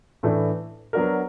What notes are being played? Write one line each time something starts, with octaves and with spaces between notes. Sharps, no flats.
A2 E3 A3 D4
F#3 B3 D4 F#4 A#4